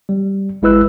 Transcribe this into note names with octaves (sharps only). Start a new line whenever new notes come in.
G3
G#1 G#3 E4 B4 E6 F#6